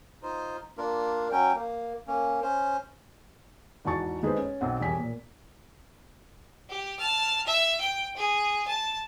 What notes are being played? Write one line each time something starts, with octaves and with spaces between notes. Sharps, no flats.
D#4 F4 C5
A#3 D4 F4 A#4
F#3 C#4 G5
A#3
A#3 C#4
C#4 C5
E2 G#2 F#4 A5 C#6 A6
G#3 D#4 G#4 A4 B4 C5
C#4
B1 C4 F#5
E1 G3 G#5 B6
A#2
G4
A5 F6
E5
G5
G#4
A5